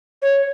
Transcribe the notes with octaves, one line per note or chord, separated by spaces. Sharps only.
C#5